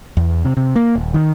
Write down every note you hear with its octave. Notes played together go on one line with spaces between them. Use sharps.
E2
C3
C3
A#3
D#1
D#3